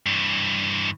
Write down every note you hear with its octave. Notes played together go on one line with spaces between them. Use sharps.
G2 E3